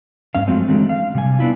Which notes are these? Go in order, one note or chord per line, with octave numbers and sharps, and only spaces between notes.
G2 C#4 F5
F3 F#3 G#3 A3 C4 C#4
D3 E3 F#3 G#3 A3 C4
F5
C3 G3 G#5
B3 D4 E4 F4